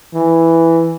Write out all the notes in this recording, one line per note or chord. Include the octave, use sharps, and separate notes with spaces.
E3